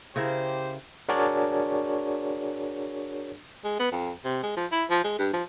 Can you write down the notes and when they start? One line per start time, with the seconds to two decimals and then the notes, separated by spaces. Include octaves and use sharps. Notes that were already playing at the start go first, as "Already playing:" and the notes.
0.16 C#3 E4 G4 A#4 C5
1.09 D4 F#4 G#4 A#4 C#5 D5
3.64 G#3
3.80 B3
3.92 F2
4.25 C3
4.43 G#3
4.57 F3
4.72 E4
4.90 F3
5.04 G#3
5.19 G2
5.33 F3